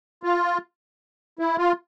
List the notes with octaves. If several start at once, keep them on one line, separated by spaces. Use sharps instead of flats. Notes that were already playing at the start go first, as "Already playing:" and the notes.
F4
E4
F4